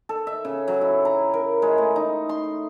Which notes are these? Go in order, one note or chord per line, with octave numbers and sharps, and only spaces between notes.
A4
E5
C#3
F#3
E4
A#5
A#4
G#3
A3
D#4
C6